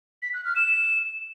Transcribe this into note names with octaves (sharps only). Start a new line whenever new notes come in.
B6
F#6
F6
E7